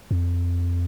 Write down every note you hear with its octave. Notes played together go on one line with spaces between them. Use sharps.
F2